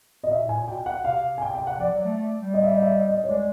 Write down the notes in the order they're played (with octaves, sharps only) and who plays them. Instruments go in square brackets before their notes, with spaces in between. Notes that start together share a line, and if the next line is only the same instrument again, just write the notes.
[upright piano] D#5
[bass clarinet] B2
[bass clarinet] A#2 [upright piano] E5
[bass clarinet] A2
[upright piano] G#5
[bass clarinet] A#2
[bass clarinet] B2 [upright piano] G5
[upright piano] F#5
[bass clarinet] C3 [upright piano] F5
[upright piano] G#5
G5
G5
F#5
[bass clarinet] F3 [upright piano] D5
[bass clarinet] F#3
A3
A3
G3
[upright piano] D#5
E5
D#5
E5
D#5
D#5
C#5
[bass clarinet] G#3 [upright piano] D5